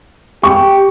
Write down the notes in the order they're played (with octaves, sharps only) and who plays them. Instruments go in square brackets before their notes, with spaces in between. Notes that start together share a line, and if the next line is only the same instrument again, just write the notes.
[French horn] G4 [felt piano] C#6